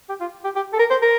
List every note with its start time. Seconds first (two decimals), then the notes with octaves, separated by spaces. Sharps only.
0.09 G4
0.21 F4
0.44 G4
0.56 G4
0.73 A4
0.79 A#4
0.90 C5
1.02 A#4